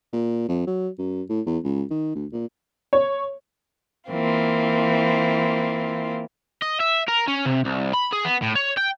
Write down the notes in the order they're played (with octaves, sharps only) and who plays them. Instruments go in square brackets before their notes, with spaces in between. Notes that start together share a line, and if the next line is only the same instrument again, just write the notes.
[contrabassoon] A#2
F2
F#3
F#2
A2
E2
C#2
D#3
D2
A#2
[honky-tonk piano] C#5
[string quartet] E3 A#3 C4 F4
[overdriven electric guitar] D#5
E5
A#4
C#4
C3
C2
B5
G#4
B3
A2
C#5
G5